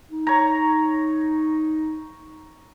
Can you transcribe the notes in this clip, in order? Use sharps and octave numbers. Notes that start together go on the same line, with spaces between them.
D#4
C#5 A#5